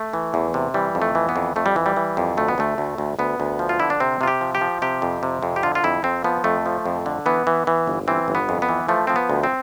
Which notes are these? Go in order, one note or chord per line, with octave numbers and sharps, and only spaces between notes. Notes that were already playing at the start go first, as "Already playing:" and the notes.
Already playing: A3
E3
E2
C3
E3 G3
F2
A3
E3
B3
F2
F2 A3
G3
E3
G3
E3
F2
D2 A3
B3
D2 A3
D2
D2
D2 B3
D2
F3
F4
D3 E4
D4
C3 C4
C3 F4
G4
F3
G4
F3
C3 G4
F2
C3
F2
G4
D3 F4
F4
F2 E4
F2 C4
F3 B3
F2 A3
F3
F2
D3
E3 B3
E3
E3
G1
E3 C4
G1
B3
F2
B3
E3
F3 A3
F3 C4
B3
D2
C4